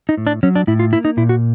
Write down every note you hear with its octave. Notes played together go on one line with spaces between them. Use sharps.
D#4
A2
D4
F#3 C#4
D4
A2 E4
F4
A#3 E4
D#4
A#2 E4
F#4